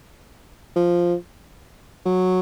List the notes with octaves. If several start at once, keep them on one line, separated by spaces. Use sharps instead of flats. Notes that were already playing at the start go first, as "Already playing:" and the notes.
F3
F#3